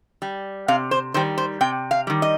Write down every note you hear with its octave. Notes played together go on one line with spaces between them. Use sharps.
G3
C3 F5
C5
D#3 G3 C5
C5
C3 G5
F5
D#3 G3
D#5